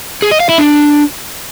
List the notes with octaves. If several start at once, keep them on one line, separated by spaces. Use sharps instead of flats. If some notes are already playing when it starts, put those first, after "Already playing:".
G#4
D#5
F5
E4
D4